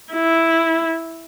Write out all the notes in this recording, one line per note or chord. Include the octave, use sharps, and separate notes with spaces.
E4